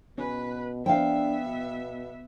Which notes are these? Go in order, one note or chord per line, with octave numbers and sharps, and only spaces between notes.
B2 C#4 B4
F3 B3 D4 E5 F5 G5
B2